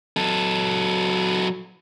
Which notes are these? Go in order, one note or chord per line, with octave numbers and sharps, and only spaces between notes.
F#3 A4